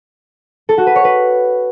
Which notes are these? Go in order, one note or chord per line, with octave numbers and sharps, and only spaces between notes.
A4
F#4
B4
C#5
B4